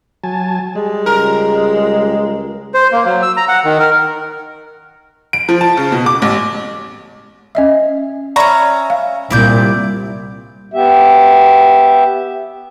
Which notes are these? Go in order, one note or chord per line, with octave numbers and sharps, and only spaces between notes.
F#3 G#5 A5
G3 G#3
C#2 A#4
C5
A#3
F#3
E6
A#5
F#5
D#3
A#4
D7
F3
A5
C#3
B2
D6
A1
C#4 D#5 E5
C#4 D5 E5 A#5 B5 C#6
F5
C2 A#2 E4 D5 G6
B3 G4 E5